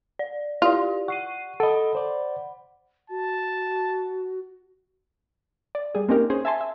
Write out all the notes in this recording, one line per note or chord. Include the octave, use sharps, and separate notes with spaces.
D5
E4 F4 G4 D5
F#5 C#6 C7 D#7
A4 D#5 F#5 B5
C5 D5
F#4 A5
D5
G3 G#4
A#3 C4 C#4 D#4 G4 A#4
C#4 G#4 C5
E5 G#5 A5 C6
E5